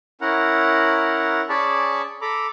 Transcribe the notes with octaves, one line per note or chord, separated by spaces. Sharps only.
C#4 E4 A#4 F#5 A#5
C#4 G#4 D5 A5 B5 C#6
A4 A#5 B5 D6